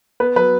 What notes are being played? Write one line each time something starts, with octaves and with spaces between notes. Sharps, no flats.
B3 B4
F#3 B4